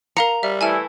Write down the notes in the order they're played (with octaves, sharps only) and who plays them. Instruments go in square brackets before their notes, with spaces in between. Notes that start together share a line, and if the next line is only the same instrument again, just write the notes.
[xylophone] A#4 F5 C#7 [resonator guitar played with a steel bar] A#5
[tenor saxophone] G3 [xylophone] E5
[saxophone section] E3 A3 E4 [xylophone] G#5 A5 F6